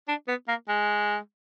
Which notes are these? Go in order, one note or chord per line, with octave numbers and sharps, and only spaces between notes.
D4
B3
A#3
G#3